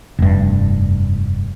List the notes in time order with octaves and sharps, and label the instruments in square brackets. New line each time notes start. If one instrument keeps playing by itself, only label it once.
[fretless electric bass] F1 G2